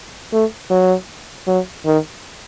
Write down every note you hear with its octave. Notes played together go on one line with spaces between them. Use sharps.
A3
F#3
F#3
D#3